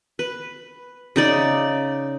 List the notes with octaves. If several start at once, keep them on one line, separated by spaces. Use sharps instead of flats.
B4
C#3 D#4 D5